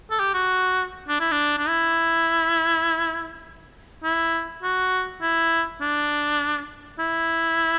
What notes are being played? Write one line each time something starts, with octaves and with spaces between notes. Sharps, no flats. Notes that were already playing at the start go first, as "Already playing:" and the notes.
A4
G4
F#4
D4
E4
D4
D4
E4
E4
F#4
E4
D4
E4